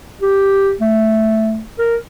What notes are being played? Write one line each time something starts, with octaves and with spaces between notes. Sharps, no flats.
G4
A3
A#4